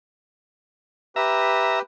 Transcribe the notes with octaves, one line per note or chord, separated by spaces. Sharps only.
G4 B4 E5 A#5